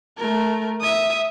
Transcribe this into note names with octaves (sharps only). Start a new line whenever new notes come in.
A3 A#4
E5 D#6